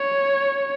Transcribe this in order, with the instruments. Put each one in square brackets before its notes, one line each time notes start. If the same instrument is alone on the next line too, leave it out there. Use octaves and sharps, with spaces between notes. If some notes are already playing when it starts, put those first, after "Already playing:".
Already playing: [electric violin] C#5